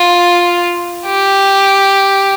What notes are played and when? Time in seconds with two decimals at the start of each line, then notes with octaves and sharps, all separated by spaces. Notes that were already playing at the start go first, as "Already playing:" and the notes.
Already playing: F4
1.07 G4